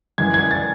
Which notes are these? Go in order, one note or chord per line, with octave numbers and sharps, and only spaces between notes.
F#2 E3 G#3 G#6
G#6
A6